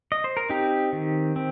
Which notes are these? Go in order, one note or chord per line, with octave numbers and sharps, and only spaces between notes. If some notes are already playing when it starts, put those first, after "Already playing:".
D#5
C5
A#4
C4 D#4 G4
D#3
C4